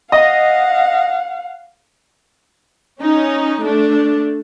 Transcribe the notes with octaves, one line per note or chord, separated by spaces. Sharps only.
D#5 F5 F#5
C#4 D#4
A3 D4